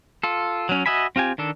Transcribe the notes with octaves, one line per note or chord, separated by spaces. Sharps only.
F4 A4
F#3 C#4
F#4 D#5 E5 G#5 B5
C4 F4 G4 G#5
D#3 D4 A4